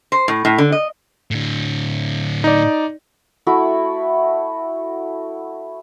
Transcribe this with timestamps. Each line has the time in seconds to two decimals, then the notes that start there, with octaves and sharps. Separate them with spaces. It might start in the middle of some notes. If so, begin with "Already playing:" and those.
0.12 C5
0.28 A2
0.45 A2
0.58 D3
0.72 D#5
1.31 A2 D3
2.44 D#4 D5
3.46 A3 E4 F#4